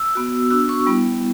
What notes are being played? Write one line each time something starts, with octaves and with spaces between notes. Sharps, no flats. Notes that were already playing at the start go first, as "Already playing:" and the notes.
Already playing: E6
B3 F#4
B3 D4 F#4 E6
C#6
G3 B3 E4